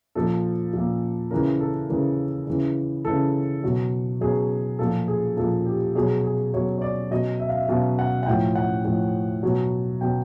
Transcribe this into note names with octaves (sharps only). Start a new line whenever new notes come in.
A#2 F3 A4
A#2 F3
C#3 E3 A#4
A4
C#3 E3 A#4
C#3 E3
C#3 E3 A4
B2 F#3
B2 F#3 G#4
A#2 F3 A4
G#4
A#2 F3 A4
G4
B2 F#3 G#4
G#4
B2 F#3 C#5
C#5
D5
B2 F#3 D#5
E5
F5
E5
B2 F#3 F5
F#5
F#5
A2 F3 G5
F#5
A2 F3
B2 F#3
B2 F#3 G5